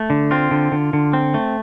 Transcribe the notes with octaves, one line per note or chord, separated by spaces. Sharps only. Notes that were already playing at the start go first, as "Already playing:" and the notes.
Already playing: A3
D3
C4 F4
D3
D3
D3
C4
A3